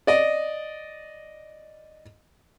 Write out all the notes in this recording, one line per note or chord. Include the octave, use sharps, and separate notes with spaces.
D5 D#5